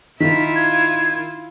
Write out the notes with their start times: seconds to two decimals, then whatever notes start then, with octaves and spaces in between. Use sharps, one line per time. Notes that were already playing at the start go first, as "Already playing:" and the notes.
0.20 D#3 E4 F4 B6
0.55 G#6